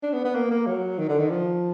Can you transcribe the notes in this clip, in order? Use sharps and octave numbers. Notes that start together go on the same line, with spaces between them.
D4
B3
B3
A#3
A#3
F#3
D#3
D3
D#3
F3